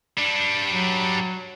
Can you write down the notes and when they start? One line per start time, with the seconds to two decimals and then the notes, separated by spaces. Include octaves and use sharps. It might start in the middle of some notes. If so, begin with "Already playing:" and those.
0.18 G3 D4
0.71 F#3